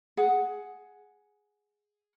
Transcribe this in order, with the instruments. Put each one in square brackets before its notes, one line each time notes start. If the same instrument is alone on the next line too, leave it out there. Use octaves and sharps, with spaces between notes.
[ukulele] G#4 F#5